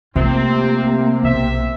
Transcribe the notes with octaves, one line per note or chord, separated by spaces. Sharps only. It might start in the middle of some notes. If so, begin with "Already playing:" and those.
C3 A3 A#3 C4 F4
B1 E5